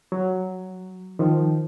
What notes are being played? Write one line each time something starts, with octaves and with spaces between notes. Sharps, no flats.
F#3
D#3 F3